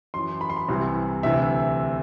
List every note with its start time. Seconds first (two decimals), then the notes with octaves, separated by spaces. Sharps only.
0.14 F#2 E3 C6
0.41 B5
0.50 C6
0.57 B5
0.68 C2 C3 E3
1.23 D2 C3 E3 E5